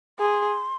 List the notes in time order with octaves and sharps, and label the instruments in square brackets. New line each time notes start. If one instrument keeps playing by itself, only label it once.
[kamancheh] G#4 [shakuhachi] C6